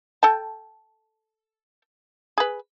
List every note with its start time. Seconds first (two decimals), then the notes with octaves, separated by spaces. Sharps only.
0.23 A4 G5 A5
2.38 G#4 B4